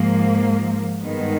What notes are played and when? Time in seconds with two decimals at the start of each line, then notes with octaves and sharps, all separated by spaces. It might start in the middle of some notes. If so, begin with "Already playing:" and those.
Already playing: G#2 F3 A#3
1.00 G2 D#3 G#3 B3